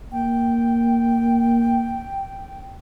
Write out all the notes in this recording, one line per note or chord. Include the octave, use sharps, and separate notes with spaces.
A#3 G5